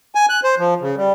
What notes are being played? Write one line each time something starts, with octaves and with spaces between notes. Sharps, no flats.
G#5
F#6
C5
F3
C#3
G3